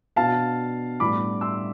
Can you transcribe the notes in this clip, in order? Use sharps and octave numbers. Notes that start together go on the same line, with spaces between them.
B2 B3 D4 F5 A5
A2 G3 B3 D4 B5 D6
C6 E6